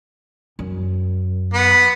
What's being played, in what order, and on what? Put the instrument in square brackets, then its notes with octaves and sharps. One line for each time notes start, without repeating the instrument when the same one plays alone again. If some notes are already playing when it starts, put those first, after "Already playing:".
[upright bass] F#2
[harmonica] B3